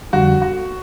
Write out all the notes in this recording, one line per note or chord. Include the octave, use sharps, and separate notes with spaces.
F2 D3 G3 F#4
F#4